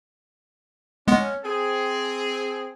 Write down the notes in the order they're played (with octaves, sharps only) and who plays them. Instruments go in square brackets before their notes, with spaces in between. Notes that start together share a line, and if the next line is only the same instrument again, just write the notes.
[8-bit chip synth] G#3 B3 [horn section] C#4
[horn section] C4 G#4